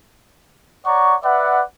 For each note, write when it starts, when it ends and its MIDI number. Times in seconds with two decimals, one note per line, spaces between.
0.86 1.15 73
0.86 1.15 74
0.86 1.15 78
0.86 1.15 82
0.86 1.15 85
1.24 1.61 71
1.24 1.61 74
1.24 1.61 76
1.24 1.61 78